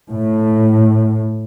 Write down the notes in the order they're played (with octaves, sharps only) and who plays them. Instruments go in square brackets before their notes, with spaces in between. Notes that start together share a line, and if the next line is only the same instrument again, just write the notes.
[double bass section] A2